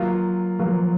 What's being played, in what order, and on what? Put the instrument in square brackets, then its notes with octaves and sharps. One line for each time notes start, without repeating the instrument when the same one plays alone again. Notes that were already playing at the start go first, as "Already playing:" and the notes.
Already playing: [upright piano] F#3 A#3 F4
[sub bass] F3 [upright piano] F#3 A#3 F4